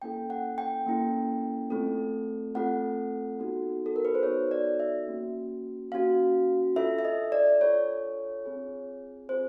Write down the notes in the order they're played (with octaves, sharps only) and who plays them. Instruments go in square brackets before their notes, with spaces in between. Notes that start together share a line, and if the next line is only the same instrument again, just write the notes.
[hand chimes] A#3 C#4 E4 A4 G5
F#5
G5
A#3 C#4 E4 A4
A3 C4 F4 A4
A3 C4 F4 A4 F#5
B3 D#4 F#4 A4
A4
A#4
B4
C5
B3 D#4 F#4 A4 C#5
D5
E5
A#3 C#4 F#4
A#3 C#4 F#4 F5
D4 F4 A4 E5
E5
D#5
D5
D4 F4 A4 C#5
C4 F4 G#4
C4 F4 G#4 C5